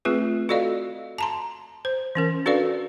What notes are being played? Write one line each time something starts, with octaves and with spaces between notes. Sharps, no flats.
A3 C4 F4 G#4 B4
F#4 A4 D5 D#5 F5
A5 A#5 C6
C5
E3 C#4 A#4
D4 F#4 A4 B4 D5 F5